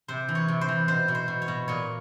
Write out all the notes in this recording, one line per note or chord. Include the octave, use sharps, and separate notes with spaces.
C3 C5
E3
C#5
C3
C5
E3
B2 C5
B2
C5
B2
C#5
B2
A#2 C#5